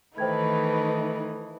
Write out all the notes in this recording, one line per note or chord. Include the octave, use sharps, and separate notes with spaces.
D#3 E3 A3 D#4 B4 C5 G5 G#6